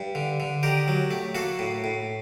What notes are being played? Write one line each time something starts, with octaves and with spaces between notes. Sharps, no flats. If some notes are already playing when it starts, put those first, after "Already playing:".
Already playing: G2
D3
D3
D#3 G4 A#4
F#3
A3
A#3 F#4 A4
A2
A2